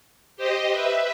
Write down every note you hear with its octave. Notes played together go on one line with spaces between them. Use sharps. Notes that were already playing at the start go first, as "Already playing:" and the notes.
G4 C5 D#5
B4 E5